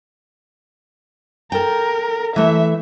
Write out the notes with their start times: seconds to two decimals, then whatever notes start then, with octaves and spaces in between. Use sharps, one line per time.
1.52 A4 A#4 G5
2.36 E3 A3 E5